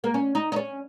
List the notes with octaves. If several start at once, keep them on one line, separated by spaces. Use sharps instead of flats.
A#3
C#4
D#4
D#4
C#4